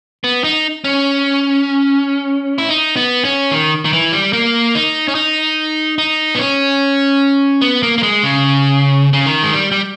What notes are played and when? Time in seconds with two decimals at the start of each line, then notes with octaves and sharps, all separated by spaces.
0.24 B3
0.44 D#4
0.84 C#4
2.58 E4
2.69 D#4
2.96 B3
3.25 C#4
3.51 D#3
3.85 D#3
3.93 E3
4.13 G3
4.33 A#3
4.75 D#4
5.08 C#4
5.15 D#4
5.98 D#4
6.35 B3
6.39 C#4
7.61 B3
7.83 A#3
7.98 A#3
8.03 G#3
8.23 C#3
9.13 C#3
9.26 D#3
9.43 G#3
9.53 G3
9.72 G3